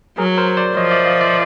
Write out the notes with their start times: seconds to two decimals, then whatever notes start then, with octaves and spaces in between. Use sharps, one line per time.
0.18 F#3 G#4 A#4
0.37 A#4 C5
0.57 C5 D5
0.76 F3 C#5 D#5
0.91 D5 E5
1.05 D#5 F5
1.21 D5 E5